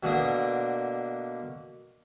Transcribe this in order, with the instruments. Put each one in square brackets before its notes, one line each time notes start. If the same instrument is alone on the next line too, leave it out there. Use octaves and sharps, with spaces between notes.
[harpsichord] B2 D3 A#3 D#6